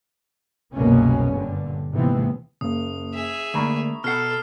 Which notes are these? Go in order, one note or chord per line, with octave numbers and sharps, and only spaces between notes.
F#1 C2 B2 A#3 B3 C#4
G2 A#2 D3
D#2 G#2 C3 E3 B3 C4
F#1 A#3 D#6
G#4 E5
D3 A3 A#3 A#5 B5 C#6
B2 A4 F#5 F6 C7